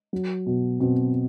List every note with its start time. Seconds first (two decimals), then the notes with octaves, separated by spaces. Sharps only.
0.13 F#3
0.47 B2
0.80 B2 C4